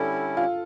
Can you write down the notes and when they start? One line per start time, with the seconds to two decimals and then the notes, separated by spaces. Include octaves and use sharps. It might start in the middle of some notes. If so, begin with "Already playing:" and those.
Already playing: D3 G3 C#4 E4 A4
0.37 F4